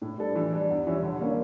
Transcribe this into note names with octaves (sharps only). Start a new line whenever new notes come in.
A2
G3 D4 A4
E3
G3 D4
E2
E3 G3 C#4 E4
D3
G3 A#3 C#4